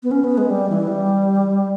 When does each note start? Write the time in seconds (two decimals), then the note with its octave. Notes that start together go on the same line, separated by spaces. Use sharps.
0.03 B3
0.11 C#4
0.24 B3
0.38 G#3
0.50 G3
0.69 E3
0.87 G3